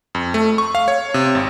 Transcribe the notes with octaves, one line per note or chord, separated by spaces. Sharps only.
F2
A3
C#6
F5
C#5
C3
G#1